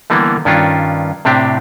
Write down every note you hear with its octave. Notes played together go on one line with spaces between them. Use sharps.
D3 E3 G3 A#3 B3
G2 D#3 C#4 D4 F4
A2 C3 C4 D4 G4